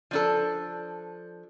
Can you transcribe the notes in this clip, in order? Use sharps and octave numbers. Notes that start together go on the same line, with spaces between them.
F3 D4 A4